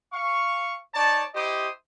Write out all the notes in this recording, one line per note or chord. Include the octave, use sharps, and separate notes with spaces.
F5 C#6
D#4 C#5 D5 A5
E4 G4 C5 D#5 D#6